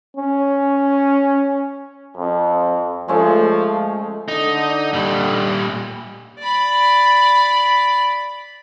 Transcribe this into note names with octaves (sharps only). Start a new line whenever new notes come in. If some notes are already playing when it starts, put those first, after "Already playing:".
C#4
F2
F3 G#3 A3 C#4
D3 D#4
A#2 G3
D5 B5